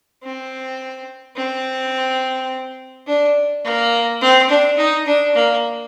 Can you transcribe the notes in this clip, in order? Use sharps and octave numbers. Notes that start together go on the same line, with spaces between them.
C4
C4
D4
A#3
C4
D4
D#4
D4
A#3